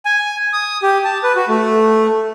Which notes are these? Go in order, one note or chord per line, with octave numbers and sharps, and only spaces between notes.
G#5
D#6
G4
A5
B4
F#4
A3